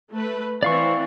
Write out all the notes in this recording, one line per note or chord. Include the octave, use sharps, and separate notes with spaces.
A3 B4
E3 C4 D5 F5 C#6